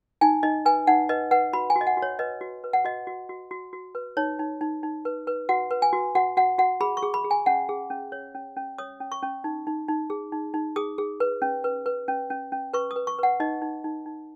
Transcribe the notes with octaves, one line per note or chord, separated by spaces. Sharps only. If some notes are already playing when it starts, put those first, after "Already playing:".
D#4 G#5
D#4 D#5
B4 G#5
D#4 F#5
B4 D#5
B4 F#5
F#4 B5
G#5
F#4
D#5
F#5
F#4
C#5
B4 D#5
F#4
B4
F#5
F#4 D#5
F#4
F#4
F#4
F#4
B4
D#4 C#5
D#4
D#4
D#4
B4
B4
F#4 F#5
B4
G#5
F#4
F#4 F#5
F#4 F#5
F#4 F#5
G#4 B5
C#6
G#4
B5
G#4
G#5
C#4 F#5
G#4
C#4
C#5
C#4
C#4
C#5 D#6
C#4
C#6
C#4
D#4
D#4
D#4
G#4
D#4
D#4
G#4 D#6
G#4
B4
C#4
B4
B4
C#4
C#4
C#4
B4 C#6
D#6
B4
C#6
B4 F#5
D#4 D#5
D#4
D#4
D#4